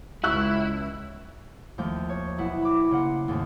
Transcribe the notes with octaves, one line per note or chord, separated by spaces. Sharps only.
C#2 E4 C#6 E6 F#6
D#2 F3 A3 G6
C#5
B1 E4 F#5
B5 D6
C#3 A#3 F#5 C6
D#2 G#2 C#3 A3 C4